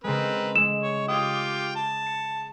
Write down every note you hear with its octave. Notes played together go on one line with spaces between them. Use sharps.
C#3 G#3 C4 A#4 B4
G#3 E6 E7
C#5
F4 G4 C#5 G5 D6 D#6
A5
C#7